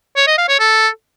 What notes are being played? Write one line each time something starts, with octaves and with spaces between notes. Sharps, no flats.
C#5
D#5
F5
C#5
A4